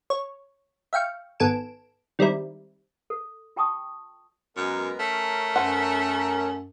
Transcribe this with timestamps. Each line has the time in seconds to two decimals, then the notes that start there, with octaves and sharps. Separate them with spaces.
0.10 C#5
0.93 E5 F5 G5 C#6
1.40 G#1 B3 A4 G#5 D7 E7
2.19 D#3 G3 G#3 C4 E4
3.10 A4
3.56 F4 G5 A5 C#6 D#6
4.57 F#2 G#3 B3 A#4
5.00 A3 C#4 A#4
5.56 F#2 B4 C5 F#5